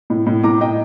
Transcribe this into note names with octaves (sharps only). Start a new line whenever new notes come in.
A2
A2
A2 A#5 D6
A2 D#5 G5